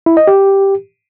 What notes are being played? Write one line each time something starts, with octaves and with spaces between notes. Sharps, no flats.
E4
D#5
G4